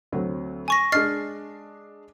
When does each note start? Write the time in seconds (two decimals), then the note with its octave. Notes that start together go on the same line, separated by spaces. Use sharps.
0.12 D2 F#3 C4
0.68 G#5 C#6 A#6
0.92 G#3 D4 D#5 F6 A6 C7